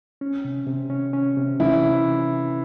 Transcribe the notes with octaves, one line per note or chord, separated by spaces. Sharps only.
C#4
C3
C3
C#4
C#4
C3
E3 C#4 E4
C3